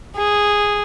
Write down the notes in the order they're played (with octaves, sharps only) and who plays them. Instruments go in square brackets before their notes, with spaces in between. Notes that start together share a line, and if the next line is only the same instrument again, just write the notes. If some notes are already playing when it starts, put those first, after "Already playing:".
[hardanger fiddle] G#4